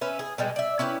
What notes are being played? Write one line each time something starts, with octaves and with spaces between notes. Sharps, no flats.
C#4 B4 E5
G#4
B2 G3 G#3
D5 E5
C#4 E4 G4 B4